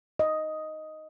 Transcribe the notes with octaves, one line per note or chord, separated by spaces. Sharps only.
D#5